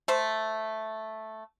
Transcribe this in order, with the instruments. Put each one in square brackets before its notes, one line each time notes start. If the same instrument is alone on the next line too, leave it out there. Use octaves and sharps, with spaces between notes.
[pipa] A3 C5